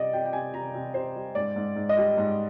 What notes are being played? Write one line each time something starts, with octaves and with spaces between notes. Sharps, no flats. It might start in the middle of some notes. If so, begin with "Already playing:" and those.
Already playing: C3 G3 D5 D#5
C3 G5
G5
C3 G#5
C3 A#5
C3
C3 C5
G3
G#2 D5
G#2
G#2
D#5
G3
G#2